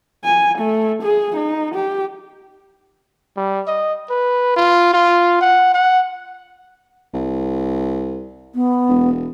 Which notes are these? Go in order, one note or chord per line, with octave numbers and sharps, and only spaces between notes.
G#5
A3
G#4
D#4
G4
G3
D#5
B4
F4
F4
F#5
F#5
C2
B3
E1